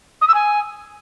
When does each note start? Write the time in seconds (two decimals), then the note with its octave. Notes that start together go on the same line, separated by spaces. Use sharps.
0.21 D#6
0.28 E6
0.34 G#5